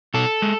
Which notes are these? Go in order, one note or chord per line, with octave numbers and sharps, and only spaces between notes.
B2 A4
G#3